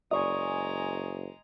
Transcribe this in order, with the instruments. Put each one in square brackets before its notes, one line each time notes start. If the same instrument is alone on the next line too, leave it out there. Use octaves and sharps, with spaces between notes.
[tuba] F#1 [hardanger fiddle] G#3 A#5 [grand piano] D5 [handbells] G#5 C#6 D#6